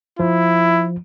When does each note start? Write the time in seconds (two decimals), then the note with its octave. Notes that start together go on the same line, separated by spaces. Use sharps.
0.19 F3 E4